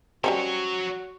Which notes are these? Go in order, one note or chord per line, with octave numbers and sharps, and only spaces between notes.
F#3 G3 C#4 F#4 C5 C#5